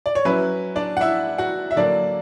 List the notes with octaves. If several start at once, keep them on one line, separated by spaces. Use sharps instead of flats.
D5
C#5
F#3 C#4 E4 B4
D4 D5
F#5
E4 E5
F#4 F#5
E5
D3 F#3 A#3 D4 E4 D5